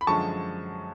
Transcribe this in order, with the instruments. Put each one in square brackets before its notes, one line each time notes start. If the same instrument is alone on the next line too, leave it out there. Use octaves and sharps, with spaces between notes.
[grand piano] B5
F#2 D3 F3 G#3 A5 C#6